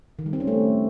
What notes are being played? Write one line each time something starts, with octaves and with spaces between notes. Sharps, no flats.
D#3
G3
C4
C#4
A3